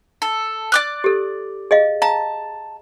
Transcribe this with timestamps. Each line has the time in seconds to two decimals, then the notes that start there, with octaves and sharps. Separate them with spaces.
0.22 A4
0.72 D5 D6 F#6
1.04 G4 A4
1.71 G#4 D#5 F5
2.02 F5 A5 A#5